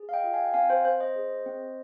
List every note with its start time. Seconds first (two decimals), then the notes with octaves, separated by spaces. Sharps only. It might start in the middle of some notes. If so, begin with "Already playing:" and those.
Already playing: G#4
0.09 F5
0.13 D#5 G5
0.24 F4
0.34 F5 G#5
0.45 G5
0.54 C4 F5 G#5
0.70 C5
0.85 C4 C5
1.00 C5 D#5
1.16 G#4
1.46 C4